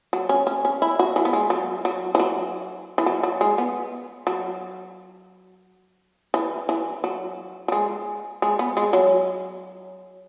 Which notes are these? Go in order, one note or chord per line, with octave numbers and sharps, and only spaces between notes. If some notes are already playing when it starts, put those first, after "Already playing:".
F#3
C#4
C#4
C#4
E4
F#4
E3
B3
G#3
F#3
F#3
E3
F#3
E3
F#3
F#3
G#3
B3
F#3
E3
E3
F#3
F#3
G#3
G#3
B3
G#3
F#3